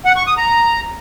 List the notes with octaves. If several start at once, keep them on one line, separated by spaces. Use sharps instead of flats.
F#5
C#6
D#6
A#5